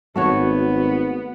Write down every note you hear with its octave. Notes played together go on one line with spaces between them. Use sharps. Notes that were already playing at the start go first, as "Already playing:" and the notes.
G#1 A3 B3 F#4 C#5